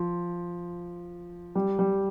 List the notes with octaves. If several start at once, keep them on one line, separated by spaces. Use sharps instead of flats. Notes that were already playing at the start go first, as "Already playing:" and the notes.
Already playing: F3
G3
G3